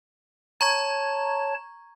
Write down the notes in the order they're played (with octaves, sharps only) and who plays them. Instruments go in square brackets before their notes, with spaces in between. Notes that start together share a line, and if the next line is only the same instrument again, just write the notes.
[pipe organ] C#5 A5 [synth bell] A#5 C#6 G#6